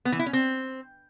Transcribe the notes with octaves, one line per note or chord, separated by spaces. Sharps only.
B3
E3
E4
C#4
C4